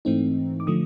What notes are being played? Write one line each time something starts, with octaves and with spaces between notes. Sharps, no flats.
G#2 E3 A3 C4 D#4
D6
D3 F3 A3 D#6